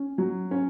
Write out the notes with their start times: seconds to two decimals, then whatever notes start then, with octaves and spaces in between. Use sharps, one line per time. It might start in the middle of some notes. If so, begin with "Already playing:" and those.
Already playing: C#4
0.18 F#3
0.51 C#4